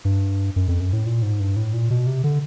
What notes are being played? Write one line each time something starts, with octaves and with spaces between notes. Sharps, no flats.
G2
F#2
F2
F#2
A2
A#2
G#2
G2
A2
A#2
B2
C3
D3